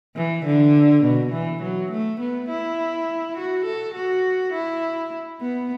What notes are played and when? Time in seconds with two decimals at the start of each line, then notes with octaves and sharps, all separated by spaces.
0.16 E3
0.45 D3
1.03 B2
1.32 E3
1.62 F#3
1.91 A3
2.20 B3
2.49 E4
3.37 F#4
3.65 A4
3.94 F#4
4.53 E4
5.41 B3